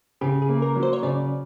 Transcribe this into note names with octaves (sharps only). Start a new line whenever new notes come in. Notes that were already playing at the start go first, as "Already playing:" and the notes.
C#3 G4
G#4
A#3
A#4
F#3
C5
C#5
C#3 D5